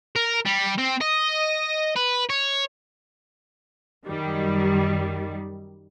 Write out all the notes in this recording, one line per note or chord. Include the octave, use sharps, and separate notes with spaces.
A#4
G3
C4
D#5
B4
C#5
F#2 D#3 G3